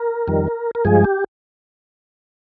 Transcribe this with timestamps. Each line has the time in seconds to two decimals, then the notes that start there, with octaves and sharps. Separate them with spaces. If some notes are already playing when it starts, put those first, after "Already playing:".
Already playing: A#4
0.27 F2 D#3 G3
0.75 A#4
0.85 G2 F3 G#3 G#4
1.04 G4